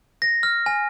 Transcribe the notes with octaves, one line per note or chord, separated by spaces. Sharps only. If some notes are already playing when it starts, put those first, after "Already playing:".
A#6
F6
G#5